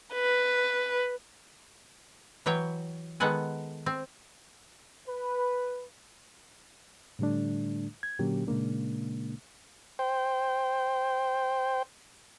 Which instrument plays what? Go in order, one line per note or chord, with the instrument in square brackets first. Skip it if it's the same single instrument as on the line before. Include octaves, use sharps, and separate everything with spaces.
[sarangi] B4
[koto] E3 F#3 C#5 G5
D#3 G#3 B3 A4 F#5 G#5
C4
[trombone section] B4
[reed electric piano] A2 D3 G3 A3 D4
G#6
A#2 D3 F#3 A#3 C#4 G4
A#2 C#3 G#3 A#3 D4
[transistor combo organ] C5 G5